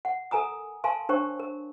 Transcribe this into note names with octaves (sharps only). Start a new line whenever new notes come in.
F#5
A4 A#4 G#5 A#5 D#6
A#4 F5 G#5 A5 C6
D4 A#4 C5 C#5 G5 C#6
A#4